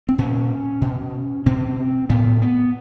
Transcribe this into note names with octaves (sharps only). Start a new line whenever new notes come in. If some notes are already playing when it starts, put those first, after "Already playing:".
C4
A#2 C#4
B2
B2 C4
A2 B3
B3